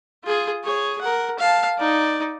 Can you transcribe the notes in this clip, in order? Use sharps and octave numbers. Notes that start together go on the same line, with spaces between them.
F4 G#4
G#4 C#5
A#4 F#5
F5 A5
D#4 D5